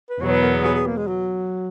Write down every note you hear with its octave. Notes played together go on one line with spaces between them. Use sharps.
B4
E2 B2 F#3 B3 C#5
B4
A#4
G#4
G#4
G#4
A#3
G#3
F#3